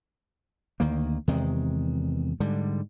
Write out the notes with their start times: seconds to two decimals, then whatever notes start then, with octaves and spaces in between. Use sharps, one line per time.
0.80 D2 D#3 A#3
1.28 E2 C3 D#3 G#3
2.40 G#2 D3 G3